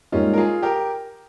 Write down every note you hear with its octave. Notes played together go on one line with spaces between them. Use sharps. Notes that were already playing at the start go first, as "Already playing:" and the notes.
G#2 G3 A#3 C#4 D#4 F4
A#4
F4 G#4
G4 A#4